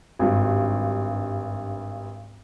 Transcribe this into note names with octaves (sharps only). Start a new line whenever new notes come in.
G#1 G2